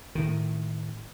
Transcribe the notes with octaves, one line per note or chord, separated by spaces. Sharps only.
A2 D#3